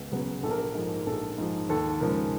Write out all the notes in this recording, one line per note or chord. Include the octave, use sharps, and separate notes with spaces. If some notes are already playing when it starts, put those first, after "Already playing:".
Already playing: C#2 B3
C#3 F#3 B3
A#1 A4
A#4
A4
G#2 F3
A#1 A4
G#2 F3
D#2 A4
C#3 F3 G#3 A#4